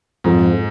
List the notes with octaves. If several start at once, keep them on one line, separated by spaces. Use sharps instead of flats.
F2 G#2